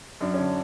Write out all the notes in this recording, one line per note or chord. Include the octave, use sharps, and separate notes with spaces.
F#2 D4
D3 C#4